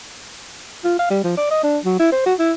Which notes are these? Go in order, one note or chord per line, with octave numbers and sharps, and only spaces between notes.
F4
F5
G3
F3
D5
D#5
D4
F#3
E4
C5
F#4
E4